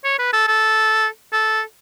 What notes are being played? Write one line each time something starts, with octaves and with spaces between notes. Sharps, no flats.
C#5
B4
A4
A4
A4